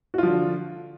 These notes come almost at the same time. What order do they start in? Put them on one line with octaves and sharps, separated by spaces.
F#4 F4 F3 D3